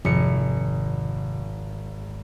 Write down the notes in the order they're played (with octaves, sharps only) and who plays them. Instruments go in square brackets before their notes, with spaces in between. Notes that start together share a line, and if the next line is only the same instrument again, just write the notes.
[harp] G#1 C#7 [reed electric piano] F2 C3